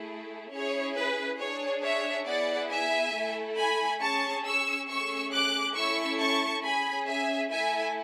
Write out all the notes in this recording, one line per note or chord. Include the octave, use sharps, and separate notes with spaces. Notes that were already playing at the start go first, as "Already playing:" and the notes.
Already playing: A3 E4 G#4
C#4 E4 G#4 C#5
B4
D4 G#4 C#5
C#5 E5
B3 E4 G#4 D5 F#5
E5 G#5
A3 E4 A4
G#5 B5
C#4 G#4 A5 C#6
C#6 E6
A3 C#4 G#4 C#6 E6
D6 F#6
A3 C#4 E4 A4 C#6 E6
A5 C#6
C#4 G#4 G#5 B5
E5 G#5
A3 E4 A4 E5 G#5